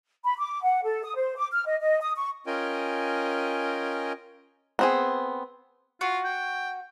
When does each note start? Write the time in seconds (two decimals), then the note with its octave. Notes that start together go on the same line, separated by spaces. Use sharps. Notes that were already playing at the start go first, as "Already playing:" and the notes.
0.24 B5
0.38 D6
0.62 F#5
0.83 A4
1.04 D#6
1.16 C5
1.37 D6
1.53 F6
1.66 D#5
1.81 D#5
2.01 D#6
2.16 C#6
2.47 C#4 F4 A#4 D#5 G5 G#5
4.79 B3 C4 G#4
6.01 F4 F#4
6.24 G5